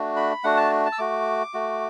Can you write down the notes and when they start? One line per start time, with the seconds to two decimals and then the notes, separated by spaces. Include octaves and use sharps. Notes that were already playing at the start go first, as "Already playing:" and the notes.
Already playing: A3 D4 F#4
0.16 B5
0.44 A3 D4 F#4 F#5
0.57 A5
0.86 A5
0.93 E6
0.99 A3 F#4 D6
1.54 A3 F#4